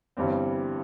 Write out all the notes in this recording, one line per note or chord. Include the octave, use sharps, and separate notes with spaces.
G1 G2 E3 G3 C4